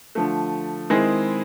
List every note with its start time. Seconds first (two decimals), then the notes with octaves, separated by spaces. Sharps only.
0.15 D3 F3 A3
0.90 D#3 G#3 C4 E4 G#4